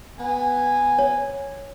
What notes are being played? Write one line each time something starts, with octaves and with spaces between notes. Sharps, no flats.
B3 G#5
C#5